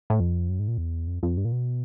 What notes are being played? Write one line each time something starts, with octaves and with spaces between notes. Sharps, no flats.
A2
F2
F#2
G#2
A#2
E2
F2
F2
G2
A#2
B2